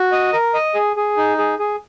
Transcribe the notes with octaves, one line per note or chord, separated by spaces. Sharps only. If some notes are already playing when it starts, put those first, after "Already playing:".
Already playing: F#4
D#5
A#4
D#5
G#4
G#4
D#4
G#4
G#4